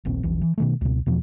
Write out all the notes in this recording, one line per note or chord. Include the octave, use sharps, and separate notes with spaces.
D#1 A#1 C4
E1 A#1 E3
E3
B2 D#3 A3
C#2 B2
E2 B2 F3